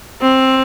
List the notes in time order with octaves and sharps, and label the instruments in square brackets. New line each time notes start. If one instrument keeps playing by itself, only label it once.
[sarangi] C4